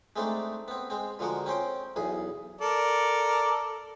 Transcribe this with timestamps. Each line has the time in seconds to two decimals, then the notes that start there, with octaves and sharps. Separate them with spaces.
0.16 G#3 A3 C4 D4 D#4
0.68 B3 C4
0.90 G#3 C4
1.19 D3 F3 G#3 F#4 A#4
1.46 C4 C#4 C5 G5
1.96 B1 E2 G#4
2.61 A4 A#4 D5